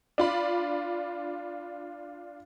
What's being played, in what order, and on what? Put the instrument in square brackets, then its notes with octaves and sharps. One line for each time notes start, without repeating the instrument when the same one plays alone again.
[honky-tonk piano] D4 F4 B5